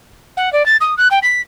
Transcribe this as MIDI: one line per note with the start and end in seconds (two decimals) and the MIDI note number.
0.37 0.52 78
0.53 0.65 74
0.66 0.77 93
0.81 0.94 87
0.98 1.08 90
1.11 1.19 79
1.23 1.41 95